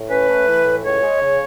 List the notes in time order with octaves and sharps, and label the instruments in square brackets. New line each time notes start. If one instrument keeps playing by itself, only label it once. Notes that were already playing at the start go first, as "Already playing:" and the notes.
Already playing: [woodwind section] A2
C#4 B4
A3
E3
A2
C#2 C#5
G#3
C#3